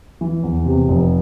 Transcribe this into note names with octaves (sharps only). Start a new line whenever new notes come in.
E3
E2
C3
F1